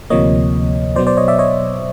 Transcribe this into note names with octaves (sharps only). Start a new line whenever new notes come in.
D2 C3 F3 A#3 C#5 D#5
B2 F#3 B3 C5 D5
C5 D5
C#5 D#5
D5 E5
C#5 D#5